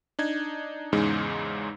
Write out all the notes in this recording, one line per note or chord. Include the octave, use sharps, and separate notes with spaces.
D4 D#4 G#6
E2 G#2 C#3 G#3 D#4